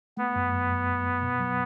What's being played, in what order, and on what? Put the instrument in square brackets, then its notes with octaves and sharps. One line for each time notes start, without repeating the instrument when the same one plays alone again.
[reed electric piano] A3 [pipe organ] B3
[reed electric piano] F#2
F#2
F#2
F#2
F#2
B2
F#3